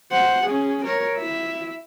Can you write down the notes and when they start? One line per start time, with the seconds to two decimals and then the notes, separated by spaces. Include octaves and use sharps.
0.12 C5 F#5
0.46 C#4 G#4
0.85 A#4 C#5
1.18 E4 E5